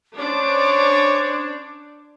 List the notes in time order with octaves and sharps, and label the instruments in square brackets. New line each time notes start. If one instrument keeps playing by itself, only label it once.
[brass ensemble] C#4 C5 [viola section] D4 [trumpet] C#5 [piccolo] D6